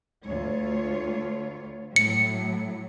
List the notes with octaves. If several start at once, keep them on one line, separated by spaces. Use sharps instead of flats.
D2 F4 C#5
A2 F#3 C#7